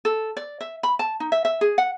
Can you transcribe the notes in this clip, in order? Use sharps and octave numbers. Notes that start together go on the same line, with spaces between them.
A4
D5
E5
B5
A5
D#4
E5
E5
G#4
F#5